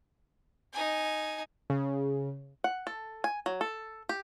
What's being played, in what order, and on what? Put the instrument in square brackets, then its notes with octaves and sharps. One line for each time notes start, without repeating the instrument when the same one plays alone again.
[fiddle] D#4 G#5
[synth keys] C#3
[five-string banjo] F#5
A4
G#5
F#3
A4
G4